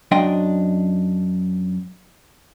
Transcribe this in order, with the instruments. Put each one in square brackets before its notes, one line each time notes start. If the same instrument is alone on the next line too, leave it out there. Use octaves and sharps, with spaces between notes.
[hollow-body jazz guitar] F#2 D4 D#5 G5 C6